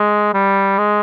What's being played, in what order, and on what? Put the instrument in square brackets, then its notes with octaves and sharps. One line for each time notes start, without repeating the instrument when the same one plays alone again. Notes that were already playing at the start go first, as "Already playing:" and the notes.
Already playing: [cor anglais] G#3
G3
G#3